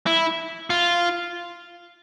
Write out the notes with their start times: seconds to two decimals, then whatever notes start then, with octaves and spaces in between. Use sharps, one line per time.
0.06 E4
0.70 F4